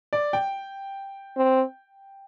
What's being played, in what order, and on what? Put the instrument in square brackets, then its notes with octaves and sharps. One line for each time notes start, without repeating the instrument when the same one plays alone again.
[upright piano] D5
G5
[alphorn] C4